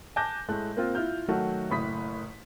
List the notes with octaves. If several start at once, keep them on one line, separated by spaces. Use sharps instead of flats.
G#5 A5 D6 F#6 G6 A#6
A2 G#3 A3 F#6
A#3 C4 F4
E4 F4 F6 G6
D#3 F#3 A3 F#4
F#1 A2 B5 D#6 B6